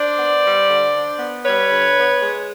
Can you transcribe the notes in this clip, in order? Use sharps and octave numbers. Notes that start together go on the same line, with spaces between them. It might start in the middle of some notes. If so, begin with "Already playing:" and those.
Already playing: D4 C5 D5
B3
G3
D3
D4
B3
G3 B4 C#5
D3
B3
G#3